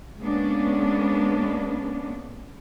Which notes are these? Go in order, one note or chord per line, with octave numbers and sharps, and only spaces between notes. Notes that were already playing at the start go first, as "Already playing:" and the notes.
G#3 A#3 B3 C#4 D4